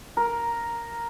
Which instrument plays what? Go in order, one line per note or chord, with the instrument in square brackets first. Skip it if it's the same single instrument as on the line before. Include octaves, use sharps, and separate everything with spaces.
[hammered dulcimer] A#4